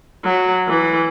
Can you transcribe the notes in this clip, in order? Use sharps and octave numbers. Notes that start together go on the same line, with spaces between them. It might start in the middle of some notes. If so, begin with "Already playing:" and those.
F#3
E3